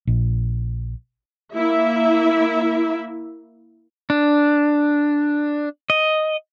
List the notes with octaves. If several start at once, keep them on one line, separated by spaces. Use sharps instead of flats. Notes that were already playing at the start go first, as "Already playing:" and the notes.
A#1
A#3 E4 E5
D4
D#5